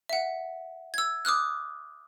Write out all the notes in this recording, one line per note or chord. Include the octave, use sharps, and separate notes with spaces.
E5 F#5
E6 G#6
D6 D#6 F6 F#6